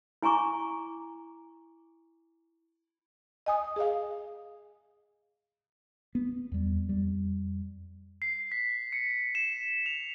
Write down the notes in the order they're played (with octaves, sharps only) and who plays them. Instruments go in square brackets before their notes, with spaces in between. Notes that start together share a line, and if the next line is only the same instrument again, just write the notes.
[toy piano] E4 G#5 A#5 C#6 D6
[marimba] D#5 G#5 D#6
G#4 D#5 F5
[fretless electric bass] B3
E2 G3
F2 G3
[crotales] C7
B6
C#7
E7
F7